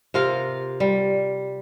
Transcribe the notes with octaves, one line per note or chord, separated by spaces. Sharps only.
C3 F4 A#4 F5
G3